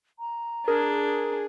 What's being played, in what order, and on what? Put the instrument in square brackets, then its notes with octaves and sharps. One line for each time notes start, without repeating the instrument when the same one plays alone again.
[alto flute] A#5
[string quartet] D4 [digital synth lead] G#4 [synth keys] A#4